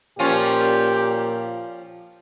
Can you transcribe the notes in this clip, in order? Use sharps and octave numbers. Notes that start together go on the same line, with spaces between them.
A#2 F3 C#4 F4 G4